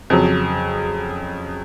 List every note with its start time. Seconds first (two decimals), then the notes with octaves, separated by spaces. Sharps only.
0.10 F2 C#3 F#3